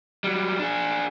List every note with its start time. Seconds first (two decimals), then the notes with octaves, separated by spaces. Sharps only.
0.24 F#3 G3
0.59 D4 G#4